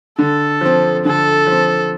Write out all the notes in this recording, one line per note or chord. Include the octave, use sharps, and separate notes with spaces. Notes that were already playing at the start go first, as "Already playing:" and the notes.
D3 A4
F3 C4
D3 A4
F3 C4